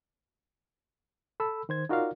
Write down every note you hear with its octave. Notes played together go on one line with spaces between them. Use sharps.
A4 B5 E6
D#3 C5 G#6
D#4 F4 F#4 A#4 D5 F5